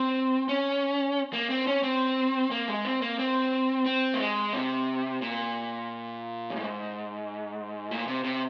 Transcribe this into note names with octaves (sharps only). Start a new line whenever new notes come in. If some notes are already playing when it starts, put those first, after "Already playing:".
Already playing: C4
C#4
A#3
C4
C#4
C4
A#3
G#3
C4
A#3
C4
C4
A#3
G#3
C3
A#2
F#2
G#2
A#2
C3
C3